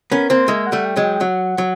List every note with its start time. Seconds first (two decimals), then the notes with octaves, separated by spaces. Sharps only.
0.11 B3 C#4 A#4
0.30 A#3 C4 C5
0.48 G#3 A#3 E5
0.67 F#5
0.72 G3 A3
0.85 G5
0.96 F#3 G#3
1.03 G5
1.14 G5
1.21 F#3 F#5
1.58 F#3